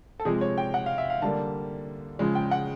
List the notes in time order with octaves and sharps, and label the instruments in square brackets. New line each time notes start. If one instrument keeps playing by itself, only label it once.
[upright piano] A4
C3 F3 G#3 G#4
C#5
G5
F#5
F5
E5
F5
D3 G3 A#3 A5
C#3 F3 G#3
G5
F#5